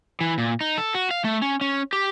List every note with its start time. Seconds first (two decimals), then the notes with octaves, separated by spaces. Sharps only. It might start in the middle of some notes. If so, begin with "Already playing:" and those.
0.21 E3
0.38 A#2
0.61 D#4
0.78 A4
0.95 F#4
1.11 F5
1.24 A3
1.42 C#4
1.61 C#4
1.93 G4